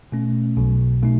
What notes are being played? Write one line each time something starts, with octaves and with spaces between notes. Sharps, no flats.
B2 A3 C#4
B1 B2 F#3
B2 A3 D#4